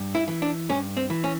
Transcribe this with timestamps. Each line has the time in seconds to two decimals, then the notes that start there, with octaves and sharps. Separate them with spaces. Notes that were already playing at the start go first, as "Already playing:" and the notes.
Already playing: G2
0.15 E4
0.28 E3
0.42 D4
0.69 G2 C#4
0.97 C4
1.10 E3
1.24 C#4